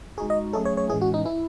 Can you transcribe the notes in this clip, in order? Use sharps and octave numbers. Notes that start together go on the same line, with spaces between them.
G#3 D#4 F#4 G#4
D#5
F#3 A3 C#4 G#4 A4
C#5
C#5
A2 E3 G#3 C#4 G#4
F#4
D#4
E4